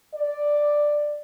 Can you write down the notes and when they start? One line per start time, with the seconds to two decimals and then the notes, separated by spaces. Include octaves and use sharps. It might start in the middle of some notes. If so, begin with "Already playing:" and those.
0.15 D5